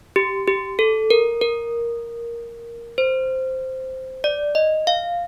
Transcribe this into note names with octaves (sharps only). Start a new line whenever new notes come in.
G4
G4
A4
A#4
A#4
C5
D5
D#5
F5